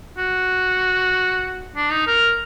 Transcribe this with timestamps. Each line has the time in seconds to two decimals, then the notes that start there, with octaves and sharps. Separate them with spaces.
0.17 F#4
1.76 D4
1.92 D#4
2.07 A#4